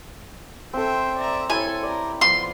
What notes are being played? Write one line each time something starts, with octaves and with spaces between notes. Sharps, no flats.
C4 A4 C5 E5 G5
D5 E5 A#5
E4 A4 C#5 G#5
G4 A#4 D5
F3 B3 F4 C6